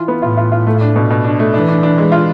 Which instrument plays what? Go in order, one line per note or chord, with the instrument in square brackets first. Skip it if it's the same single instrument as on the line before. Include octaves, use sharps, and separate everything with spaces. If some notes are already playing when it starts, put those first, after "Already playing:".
Already playing: [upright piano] E3 F4
B3
[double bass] A2 [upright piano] F4
[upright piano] F4
F4
A3
D4
B2
B2
D4
A3
[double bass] E3 [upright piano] D4
[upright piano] D4
D4
G#3
F4